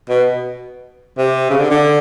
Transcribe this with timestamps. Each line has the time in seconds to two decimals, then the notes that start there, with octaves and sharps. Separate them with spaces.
0.09 B2
1.18 C3
1.50 C#3
1.60 D3
1.70 D3